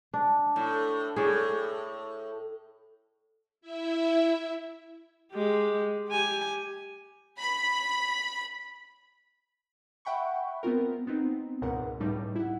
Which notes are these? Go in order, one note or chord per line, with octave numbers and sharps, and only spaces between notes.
D4
A2
A2 G#4 C#5 D5
E4 E5
G#3 G4
G4 G#5
B5
E5 F#5 G5 B5 C#6
B3 C4 F4 A#4
B3 C4 D#4
C#2 G#2 B2 A#4 F#5
C#2 A2 G3 D#4
E4 F#5